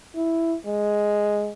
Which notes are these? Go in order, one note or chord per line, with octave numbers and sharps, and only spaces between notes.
E4
G#3